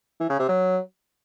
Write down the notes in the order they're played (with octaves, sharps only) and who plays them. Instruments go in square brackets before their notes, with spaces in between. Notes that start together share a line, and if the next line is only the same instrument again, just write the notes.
[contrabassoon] E3
C#3
C3
F#3